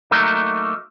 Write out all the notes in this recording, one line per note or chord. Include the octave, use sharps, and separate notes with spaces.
F#3 A3 A#3 D#4